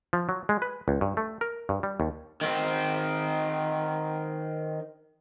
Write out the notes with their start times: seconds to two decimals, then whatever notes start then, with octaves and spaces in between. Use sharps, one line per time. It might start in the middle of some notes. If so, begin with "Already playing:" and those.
0.13 F3
0.29 F#3
0.49 G#3
0.62 B4
0.88 C#2
1.01 G2
1.17 A3
1.41 A#4
1.69 G2
1.83 G3
2.00 D#2
2.41 D#3 C4